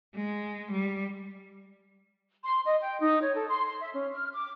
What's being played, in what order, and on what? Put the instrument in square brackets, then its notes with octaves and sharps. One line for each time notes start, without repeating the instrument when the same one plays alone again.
[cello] G#3
G3
[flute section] C6
D#5
G5
D#4
C#5
A4
C6
C6
E5
C#4
F6
D6